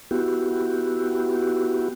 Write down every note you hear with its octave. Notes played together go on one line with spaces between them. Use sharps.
B3 E4 F#4 G4